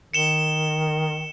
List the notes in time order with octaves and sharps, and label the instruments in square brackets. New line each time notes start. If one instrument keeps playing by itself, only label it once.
[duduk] D#3 [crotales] C#7 E7 G7